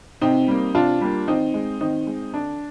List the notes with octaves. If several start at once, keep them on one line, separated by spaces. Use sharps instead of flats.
C3 C4 D#4
G3 A#3
C3 D4 F4
G3 A#3
D#3 C4 D#4
G#3
D#3 C4 D#4
G#3
D3 D4